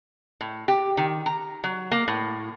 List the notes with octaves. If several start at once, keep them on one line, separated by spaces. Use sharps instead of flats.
A2
G4
D#3
A#5
F#3
A#3
A2